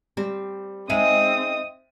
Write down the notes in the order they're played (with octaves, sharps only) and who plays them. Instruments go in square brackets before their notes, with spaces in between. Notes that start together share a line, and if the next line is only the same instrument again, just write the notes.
[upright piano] G3 [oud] C4
[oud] G#3 D#4 [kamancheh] C4 D#6 [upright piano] E5 D#7